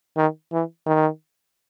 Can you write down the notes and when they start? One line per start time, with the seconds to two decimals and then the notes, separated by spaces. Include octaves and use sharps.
0.16 D#3
0.52 E3
0.86 D#3